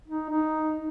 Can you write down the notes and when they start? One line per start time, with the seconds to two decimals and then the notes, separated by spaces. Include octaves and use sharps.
0.08 D#4
0.30 D#4